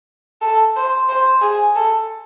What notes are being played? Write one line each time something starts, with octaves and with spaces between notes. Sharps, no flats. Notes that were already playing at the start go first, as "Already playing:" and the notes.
A4
C5
C5
G#4
A4